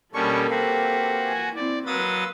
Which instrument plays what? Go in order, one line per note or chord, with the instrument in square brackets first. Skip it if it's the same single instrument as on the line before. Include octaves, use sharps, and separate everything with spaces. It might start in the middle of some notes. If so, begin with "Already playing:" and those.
[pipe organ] B2 G3 C#4 [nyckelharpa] A#3 B4 [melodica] D4 C#6 [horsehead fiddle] A4
[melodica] C4 G4 F5 [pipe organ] F#4
[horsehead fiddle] G#5
[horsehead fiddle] C4 E4 [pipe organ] D5
[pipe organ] F#3 D#6 A6 [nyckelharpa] A#3 [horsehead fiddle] B4 [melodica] F5 C6 E6